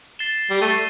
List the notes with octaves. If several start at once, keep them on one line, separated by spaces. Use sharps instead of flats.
A6 C7 E7 G7
G3
A3 A6 C7 D#7 G7